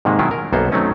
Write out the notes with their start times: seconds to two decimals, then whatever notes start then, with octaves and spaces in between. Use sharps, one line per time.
0.05 G#2 C3 D#3 G#3 A#3
0.19 B2 D#3 F#3 E4 F4
0.31 A#4
0.53 B1 F#2 A#3 B3 A4 C5
0.72 D#3 F#3 A3 C4 C#4 D#4